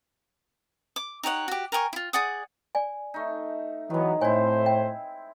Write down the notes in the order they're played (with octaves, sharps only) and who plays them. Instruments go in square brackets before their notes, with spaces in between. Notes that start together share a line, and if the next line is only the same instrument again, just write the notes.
[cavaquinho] D6
D#4 G4 C#5 F#5
F#4 G4
A#4 G5 G#5 C#6
E4 F4
G#4 D5 F#5 D#6
[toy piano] D5 G#5
[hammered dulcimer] A3 D#4
[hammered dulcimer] D#3 G#3 [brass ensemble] E3 F#3 B3
[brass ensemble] A2 C5 [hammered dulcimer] C4 E4 [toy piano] C#5 G#5
[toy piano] G5